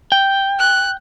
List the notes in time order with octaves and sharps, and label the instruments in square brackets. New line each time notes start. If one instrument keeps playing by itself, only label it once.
[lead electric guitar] G5
[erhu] F#6